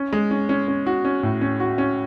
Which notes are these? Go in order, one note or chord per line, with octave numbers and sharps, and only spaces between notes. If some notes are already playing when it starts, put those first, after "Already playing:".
Already playing: C#4
G#3
C#4
C#4
C#4
F#4
C#4
A2
C#4
F#4
C#4